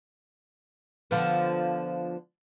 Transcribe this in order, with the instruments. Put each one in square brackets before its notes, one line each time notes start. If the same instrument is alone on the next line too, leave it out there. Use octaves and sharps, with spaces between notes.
[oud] D3 F3 B3